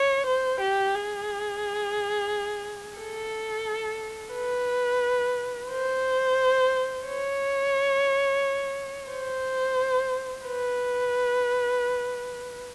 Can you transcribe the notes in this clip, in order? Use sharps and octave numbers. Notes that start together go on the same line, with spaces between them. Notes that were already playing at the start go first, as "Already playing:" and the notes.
Already playing: C#5
C5
G4
G#4
A4
B4
C5
C#5
C5
B4